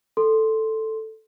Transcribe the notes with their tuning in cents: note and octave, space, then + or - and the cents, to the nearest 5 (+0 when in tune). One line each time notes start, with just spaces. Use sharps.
A4 +0 C6 +0